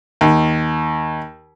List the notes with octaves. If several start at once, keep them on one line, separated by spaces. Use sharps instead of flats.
D#2